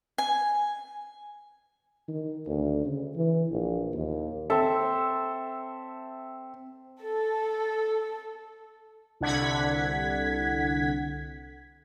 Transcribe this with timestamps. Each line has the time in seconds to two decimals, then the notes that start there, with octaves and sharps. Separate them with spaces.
0.18 G#5
2.08 D#3
2.47 D2
2.85 C#3
3.16 E3
3.51 A#1
3.94 D#2
4.50 C4 A4 C5 E5
7.01 A4
9.20 C2 D3 F#5 G#6 B6